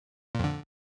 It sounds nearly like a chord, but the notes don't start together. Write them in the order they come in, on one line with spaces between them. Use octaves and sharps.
A#2 F2 D3